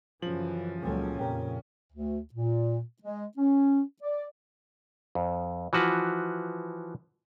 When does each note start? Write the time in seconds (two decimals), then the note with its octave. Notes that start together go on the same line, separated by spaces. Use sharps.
0.22 F#2 C#3 E3 F3 F#7
0.83 C#2 A#2 C#3 F#3 G3 C#4 A4
1.19 F2 A#2 G4 A#4 G5
1.93 D2
2.34 A#2
3.02 G#3
3.37 C#4
4.01 D5
5.15 F2
5.73 E3 F3 F#4 B4